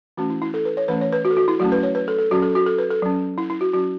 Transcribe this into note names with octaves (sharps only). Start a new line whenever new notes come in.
E3 A3 C#4 F#4
E4
E4
A4
B4
C#5
E3 A3 C#4 B4
C#5
B4
F#4
A4
F#4
E4
F#3 A3 C#4 F#4
B4
C#5
B4
A4
A4
F#3 C#4 F#4
A4
F#4
A4
B4
A4
F#3 C#4
E4
E4
F#4
F#3 C#4 F#4